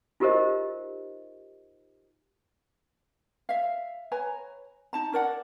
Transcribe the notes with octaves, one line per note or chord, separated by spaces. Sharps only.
D#4 F4 G4 A#4 C5 D#5
E5 F5
B4 C#5 G#5 A#5
D#4 A5 A#5
C#4 A#4 D5 F#5